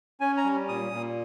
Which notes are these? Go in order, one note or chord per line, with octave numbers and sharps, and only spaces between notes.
C#4 G#5
A#5
G3
A#2 D#6
A#2